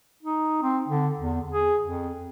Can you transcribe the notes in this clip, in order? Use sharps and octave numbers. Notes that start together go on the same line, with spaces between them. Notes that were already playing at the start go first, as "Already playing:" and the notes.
D#4
C4
D3
E2
G#4
F2